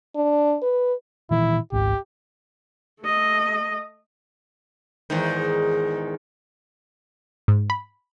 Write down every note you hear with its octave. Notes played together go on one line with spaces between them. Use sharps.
D4
B4
A#2 D#3 E3 E4
G#1 C#2 G#2 G4
A3 D#5
E2 G#2 D#3
G#2
B5